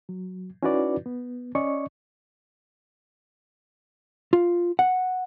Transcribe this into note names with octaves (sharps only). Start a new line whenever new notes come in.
F#3
C#4 D#4 E4 F#4 B4 D5
B3
C#4 D5 D#5 C#6
F4
F#5